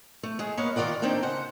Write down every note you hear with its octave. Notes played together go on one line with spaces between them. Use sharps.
A3
G#3 G#4
A#3 B3 C#5 D#5 F5 F#5
D#3 F4 A#4 D5 F#5
A#3 C4 D4 D#4 G5
C#3 C5 F#5